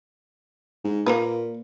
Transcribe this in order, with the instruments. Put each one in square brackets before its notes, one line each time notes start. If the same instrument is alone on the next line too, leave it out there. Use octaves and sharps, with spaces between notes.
[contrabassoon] G#2
[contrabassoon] A#2 [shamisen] A#3 A#4 B4